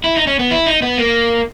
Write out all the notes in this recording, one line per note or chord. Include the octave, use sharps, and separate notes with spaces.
E4
D#4
C#4
B3
E4
D#4
B3
A#3